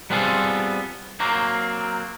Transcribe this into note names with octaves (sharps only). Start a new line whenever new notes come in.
G3 B3 C4 F4 G#4 A4
F#3 A#3 C4